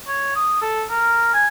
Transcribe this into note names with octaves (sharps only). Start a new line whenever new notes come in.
C#5
D#6
A4
A#4
G#5